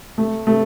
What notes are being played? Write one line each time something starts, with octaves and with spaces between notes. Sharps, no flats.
A3
A3